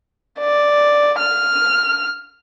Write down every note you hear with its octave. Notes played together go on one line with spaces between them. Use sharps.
D5
F6